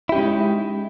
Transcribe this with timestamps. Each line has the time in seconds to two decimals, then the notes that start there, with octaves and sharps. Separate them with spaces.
0.09 E4
0.12 G4
0.15 C#4
0.18 G#3
0.21 D#4